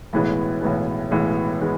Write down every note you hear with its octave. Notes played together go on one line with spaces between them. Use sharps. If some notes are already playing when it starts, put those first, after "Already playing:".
B1 A2 E3 G#3 B3
B1 A2 E3 G#3 B3
B1 A2 E3 G#3 B3
E3 G#3 B3